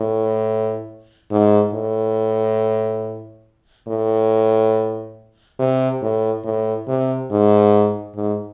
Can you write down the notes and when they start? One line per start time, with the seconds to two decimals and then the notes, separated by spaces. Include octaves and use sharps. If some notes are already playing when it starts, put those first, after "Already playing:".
Already playing: A2
1.31 G#2
1.74 A2
3.88 A2
5.59 C3
6.02 A2
6.45 A2
6.88 C3
7.31 G#2
8.15 G#2